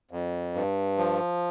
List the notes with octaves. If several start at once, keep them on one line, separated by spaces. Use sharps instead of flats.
F2
G2
F3